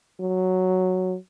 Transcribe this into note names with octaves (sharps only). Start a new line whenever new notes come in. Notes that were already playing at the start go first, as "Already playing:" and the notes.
F#3